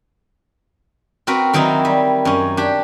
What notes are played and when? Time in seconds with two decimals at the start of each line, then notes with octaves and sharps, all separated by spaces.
1.27 C4 F#4 A#4 B4
1.53 D#3 F#3 C4 D#4 E4
1.85 G3
2.25 F#2 C#4
2.57 D4 G4